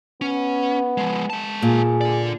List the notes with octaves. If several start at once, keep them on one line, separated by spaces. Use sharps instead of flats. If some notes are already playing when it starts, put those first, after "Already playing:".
B3 C#4
F3 G#3
G#3 A5
A#2 G#4
D3 D5